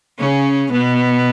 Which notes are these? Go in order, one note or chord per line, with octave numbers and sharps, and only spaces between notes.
C#3 C#4
B2 B3